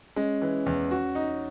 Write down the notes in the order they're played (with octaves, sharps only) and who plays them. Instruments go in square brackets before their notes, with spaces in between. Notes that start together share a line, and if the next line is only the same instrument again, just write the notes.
[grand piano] G#3 [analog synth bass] C#4
[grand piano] E3
E2
F#4
D#4